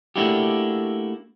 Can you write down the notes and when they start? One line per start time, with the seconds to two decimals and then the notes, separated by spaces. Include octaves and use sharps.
0.16 A3 A#3 D4 E4 F#4 G4